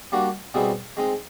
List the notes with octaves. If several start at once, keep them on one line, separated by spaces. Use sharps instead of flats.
G3 A#3 D4 F#4
B2 G3 C4 E4 G#4
G#3 C4 D#4